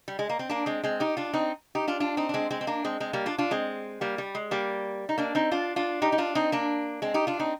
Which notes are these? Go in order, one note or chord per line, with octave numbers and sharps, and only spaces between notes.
G3
G#3
A#3
C4
A#3 D4
G#3 C4
G#3 C4
D#4 G4
D4 F4
C4 D#4
D#4 G4
D4 F4
D4 F4
C4 D#4
D4
G#3 C4
G#3 C4
C4
A#3 D4
G#3 C4
G#3 C4
G3 A#3
D4 F4
D4 F4
G#3 C4
G3 A#3
G3
G#3
G3 A#3
D#4
A#3 D4
C4 D#4
D4 F4
D4 F4
D#4 G4
D#4
D4 F4
C4 D#4
A#3 D4
G#3 C4
D#4 G4
D4 F4
C4 D#4